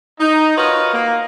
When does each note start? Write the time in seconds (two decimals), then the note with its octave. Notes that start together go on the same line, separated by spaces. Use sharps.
0.20 D#4
0.57 F4 F#4 A#4 B4 C#5 D#5
0.93 A#3